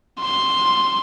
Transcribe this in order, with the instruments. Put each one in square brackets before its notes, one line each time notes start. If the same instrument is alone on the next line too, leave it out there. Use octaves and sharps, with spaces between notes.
[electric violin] C6